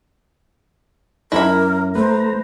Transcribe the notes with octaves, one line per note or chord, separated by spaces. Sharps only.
F#2 E4 A#4 B5 A#6
A3 B4 C5 A#5